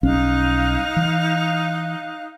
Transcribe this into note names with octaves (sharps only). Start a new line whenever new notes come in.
B1 G3 C#4 D#4 F5 F#6
E3